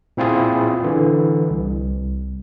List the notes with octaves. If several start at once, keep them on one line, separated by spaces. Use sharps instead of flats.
A#2 C4 E4 F4 G#4
D3 E3
C2